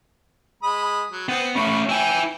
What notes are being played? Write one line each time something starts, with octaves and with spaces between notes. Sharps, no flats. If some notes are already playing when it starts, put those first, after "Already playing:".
G#3 B5 D#6
F#3
B3 C4
A3 C#4 B5 C#6
C#4 E4 G5 G#5